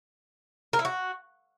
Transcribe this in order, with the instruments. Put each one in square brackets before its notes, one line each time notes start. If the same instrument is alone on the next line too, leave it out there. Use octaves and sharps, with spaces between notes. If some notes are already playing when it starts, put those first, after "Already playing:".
[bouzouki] A#4
E4
F#4